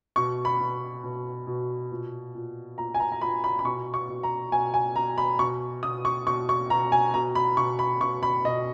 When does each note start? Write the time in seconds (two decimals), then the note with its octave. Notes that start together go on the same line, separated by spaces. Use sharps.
0.16 B2 C#6
0.45 B5
0.60 B2
1.03 B2
1.47 B2
1.91 A#2
2.35 A#2
2.78 A#2 A#5
2.94 G#5
3.00 A#5
3.12 A#5
3.21 A#2 B5
3.44 B5
3.59 B5
3.65 B2 C#6
3.94 C#6
4.09 B2
4.23 A#5
4.52 B2 G#5
4.74 G#5
4.96 B2 A#5
5.18 B5
5.39 B2 C#6
5.83 B2 D#6
6.05 C#6
6.26 B2 C#6
6.49 C#6
6.70 B2 A#5
6.92 G#5
7.14 B2 A#5
7.35 B5
7.57 B2 C#6
7.79 B5
8.01 B2 C#6
8.23 B5
8.44 B2 D#5